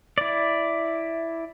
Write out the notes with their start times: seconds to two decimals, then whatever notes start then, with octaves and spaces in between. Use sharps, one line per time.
0.18 E4 D5